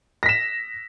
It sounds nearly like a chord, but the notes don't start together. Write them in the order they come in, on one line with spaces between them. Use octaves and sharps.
A#6 B6 E7